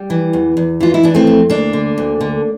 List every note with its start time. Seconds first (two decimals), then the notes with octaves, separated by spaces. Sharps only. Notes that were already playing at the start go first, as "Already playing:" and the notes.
Already playing: G3
0.10 E3
0.33 E2
0.57 E2
0.80 E3 F4
0.94 E4
1.03 E3 D4
1.14 A3 C4
1.27 F2
1.50 D2 A#3 D4
1.73 D3
1.98 D2
2.21 D3